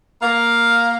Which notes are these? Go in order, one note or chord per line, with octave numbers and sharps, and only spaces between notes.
A#3 F5